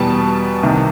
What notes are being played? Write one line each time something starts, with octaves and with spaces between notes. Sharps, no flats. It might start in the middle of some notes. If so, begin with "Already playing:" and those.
Already playing: E2 B2 G3 A5
C2 C3 D#3